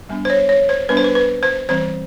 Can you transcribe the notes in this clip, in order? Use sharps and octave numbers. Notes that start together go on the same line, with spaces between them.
G3 B3 D4
C5
C#5
C#5
C5
G3 B3 D4 B4
C5
B4
B4
C5
E3 G3 C4 C5